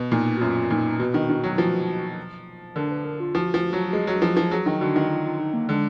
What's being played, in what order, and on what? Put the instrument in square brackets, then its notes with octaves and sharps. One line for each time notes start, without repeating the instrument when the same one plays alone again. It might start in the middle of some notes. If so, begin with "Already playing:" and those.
Already playing: [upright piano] B2
[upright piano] A#2 [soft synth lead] D#4
[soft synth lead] F#4
[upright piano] F#2 [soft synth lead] F4
[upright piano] A#2 [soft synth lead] D#4
[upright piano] B2 [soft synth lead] F#4
[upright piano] D#3
D#3
F#3
F3
[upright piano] D3 [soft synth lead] A#4
[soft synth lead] B4
A#4
F4
[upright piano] F3 [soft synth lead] F#4
[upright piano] F3
F#3
G#3
F#3
F3
F3
[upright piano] F#3 [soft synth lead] G#4
[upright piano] D#3
[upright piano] D3 [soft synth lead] F#4
[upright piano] D#3
[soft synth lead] F4
F4
D#4
A#3
[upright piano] D3 [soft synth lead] G#3